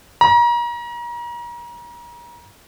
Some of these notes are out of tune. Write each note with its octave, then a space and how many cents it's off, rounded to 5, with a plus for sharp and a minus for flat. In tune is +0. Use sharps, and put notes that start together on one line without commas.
A#5 +35